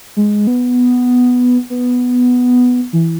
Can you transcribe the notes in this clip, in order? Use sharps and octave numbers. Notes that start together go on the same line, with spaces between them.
G#3
B3
B3
E3